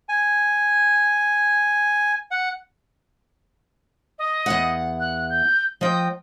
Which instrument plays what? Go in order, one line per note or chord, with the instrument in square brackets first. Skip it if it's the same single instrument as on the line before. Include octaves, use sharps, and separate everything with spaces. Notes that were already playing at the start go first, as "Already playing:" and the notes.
[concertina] G#5
F#5
[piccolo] D#5
[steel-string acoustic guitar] E2 F#5
[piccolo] F#6
G6
[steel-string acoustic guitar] F3 G5 [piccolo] D#5